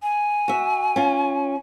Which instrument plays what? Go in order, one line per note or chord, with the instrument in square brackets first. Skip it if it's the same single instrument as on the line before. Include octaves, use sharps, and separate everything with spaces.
[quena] G#5
[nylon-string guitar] F#4 E5
C#4 F4